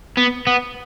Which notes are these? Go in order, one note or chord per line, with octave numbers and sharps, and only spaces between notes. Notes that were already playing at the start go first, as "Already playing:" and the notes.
B3
B3